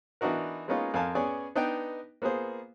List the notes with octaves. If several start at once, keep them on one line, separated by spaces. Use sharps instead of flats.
E3 B3 D4 D#4 F#4 A#4
G#3 A#3 B3 C#4 D#4 F4
F2 A#4 F5 G#5 A5
B3 C#4 G#4 D5 G#5
B3 D4 D#4 B4 D#5 G5
A#3 B3 F4 G#4 C5